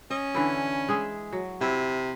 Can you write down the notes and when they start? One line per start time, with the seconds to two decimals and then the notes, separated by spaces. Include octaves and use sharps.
0.10 C#4 D#5
0.34 D3 E3 E4
0.88 G#3 G#4 E5
1.32 F#3
1.61 C3 E4